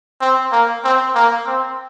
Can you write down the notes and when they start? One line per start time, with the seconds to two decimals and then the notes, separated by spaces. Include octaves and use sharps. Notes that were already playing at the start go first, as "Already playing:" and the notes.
0.21 C4
0.52 A#3
0.84 C4
1.14 A#3
1.46 C4